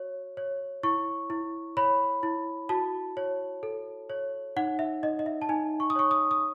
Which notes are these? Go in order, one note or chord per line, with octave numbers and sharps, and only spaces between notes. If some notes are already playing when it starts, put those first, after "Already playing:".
Already playing: F#4 C#5
C#5
E4 C#6
E4
C#5 B5
E4
F#4 A5
C#5
A4
C#5
D#4 F#5
E5
D#4 D#5
D#5
E5
A5
D#4 G#5
C#6
D#6
C#5 C#6
D#6
D#6